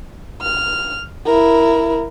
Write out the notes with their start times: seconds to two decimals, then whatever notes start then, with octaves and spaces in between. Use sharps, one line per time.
0.42 F6
1.26 E4 A#4